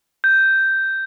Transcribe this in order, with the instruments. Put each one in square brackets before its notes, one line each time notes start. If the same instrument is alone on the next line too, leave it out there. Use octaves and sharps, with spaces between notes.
[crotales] G6